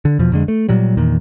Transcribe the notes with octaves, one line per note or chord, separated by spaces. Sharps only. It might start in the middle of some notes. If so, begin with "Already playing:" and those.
D3
E2 B2 F3
F2 D3 G#3
A3
A#2 F#3 G3
E2 A#2 D#3